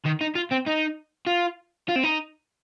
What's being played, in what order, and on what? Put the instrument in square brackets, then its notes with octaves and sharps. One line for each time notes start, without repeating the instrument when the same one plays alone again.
[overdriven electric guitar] D#3
D#4
F4
C4
D#4
F4
F4
C4
D#4